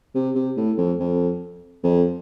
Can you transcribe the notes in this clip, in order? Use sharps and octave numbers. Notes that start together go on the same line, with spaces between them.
C3
C3
A2
F2
F2
F2